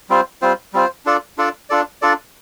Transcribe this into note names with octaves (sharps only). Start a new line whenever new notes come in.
G3 C4 F4 C5
G3 C4 F4 C5
G3 C4 F4 C5
D4 F4 A4 D5
D4 F4 A4 D5
D4 F4 A4 D5
D4 F4 A4 D5